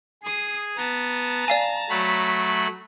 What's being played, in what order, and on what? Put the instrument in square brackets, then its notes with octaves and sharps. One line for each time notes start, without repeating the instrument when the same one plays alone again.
[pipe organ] G#4 [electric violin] D#6 C7
[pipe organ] B3 [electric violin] A5 A#5
[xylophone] D5 F5 G#5
[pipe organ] F#3 A3 B5